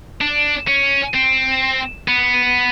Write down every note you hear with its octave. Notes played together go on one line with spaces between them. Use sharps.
D4
C#4
C4
B3